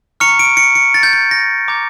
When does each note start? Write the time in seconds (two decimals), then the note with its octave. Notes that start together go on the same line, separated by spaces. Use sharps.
0.20 A#5 C#6 F6 C#7
0.39 D7
0.57 C#7
0.75 C#7
0.94 A6
1.03 G6
1.13 G6
1.31 A#6
1.68 A#5 D6 G6